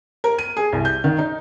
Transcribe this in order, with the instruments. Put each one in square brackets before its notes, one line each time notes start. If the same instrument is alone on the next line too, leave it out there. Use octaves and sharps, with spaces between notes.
[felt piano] A#4
D#7
G#4
C2
G6
D#3
D#4